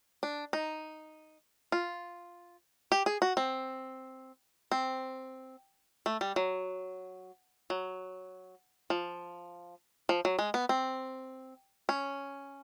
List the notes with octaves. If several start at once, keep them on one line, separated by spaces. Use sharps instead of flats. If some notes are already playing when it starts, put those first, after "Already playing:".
D4
D#4
F4
G4
G#4
F#4
C4
C4
A3
G3
F#3
F#3
F3
F3
F#3
G#3
B3
C4
C#4